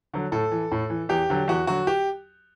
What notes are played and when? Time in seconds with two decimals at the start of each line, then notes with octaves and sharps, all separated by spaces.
0.14 D3 F#3
0.32 A2 A4
0.52 E3
0.72 A2
0.90 E3
1.09 E2 G4
1.30 D3 F#3
1.48 E2 F#4
1.67 D3 F#3 F#4
1.87 G4